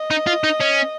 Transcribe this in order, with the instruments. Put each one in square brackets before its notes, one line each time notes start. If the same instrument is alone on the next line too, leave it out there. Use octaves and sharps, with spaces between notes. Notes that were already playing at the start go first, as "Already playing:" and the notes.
Already playing: [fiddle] D#5
[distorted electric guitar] D#4
F4
D#4
C#4